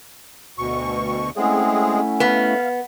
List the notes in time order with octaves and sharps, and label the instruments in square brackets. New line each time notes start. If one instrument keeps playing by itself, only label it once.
[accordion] D2 B2 C#6
[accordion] G#3 C4 G#4 [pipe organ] A3 C#4 E4 [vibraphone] F#5 G#5
[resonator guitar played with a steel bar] B3 [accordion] F5